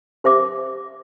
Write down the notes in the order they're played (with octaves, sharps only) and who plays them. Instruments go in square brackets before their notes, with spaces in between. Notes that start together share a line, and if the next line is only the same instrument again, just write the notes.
[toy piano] G4 C5 E5 D6